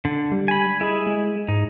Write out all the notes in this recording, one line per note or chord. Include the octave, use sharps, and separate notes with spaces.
D3
G3
G#5 B5
G#3 E4 G#4
G#3
G#2 D#4